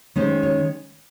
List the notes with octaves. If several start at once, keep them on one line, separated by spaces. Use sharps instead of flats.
D#3 G#3 C#4 C5
C#5